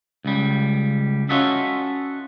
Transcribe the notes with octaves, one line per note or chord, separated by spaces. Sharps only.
C#2 G3
C#4 F4 F#4 A4 D#5 E5